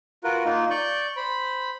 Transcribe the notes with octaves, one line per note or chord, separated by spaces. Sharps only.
F4 F#4 A#4 B4
A#3 D#4 F4
D5 C#6 G6
C5 B5